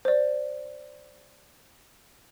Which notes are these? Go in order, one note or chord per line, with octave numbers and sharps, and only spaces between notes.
C5 D5